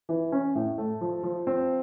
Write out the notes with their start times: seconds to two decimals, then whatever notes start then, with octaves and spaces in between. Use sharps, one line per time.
0.09 E3
0.32 C#4
0.55 A2
0.78 A3
1.01 F3
1.23 F3
1.47 C4